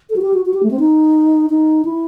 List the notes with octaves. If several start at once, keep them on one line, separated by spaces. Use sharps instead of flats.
A4
F#4
G4
F#4
F#4
G4
A3
C4
D#4
D#4
E4